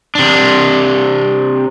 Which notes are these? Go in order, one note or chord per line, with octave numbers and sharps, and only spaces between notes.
C3 D4